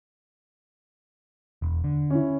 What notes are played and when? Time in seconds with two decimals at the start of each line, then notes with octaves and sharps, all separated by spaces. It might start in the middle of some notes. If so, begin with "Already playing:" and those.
1.62 E1
1.84 D3
2.10 C#4 E4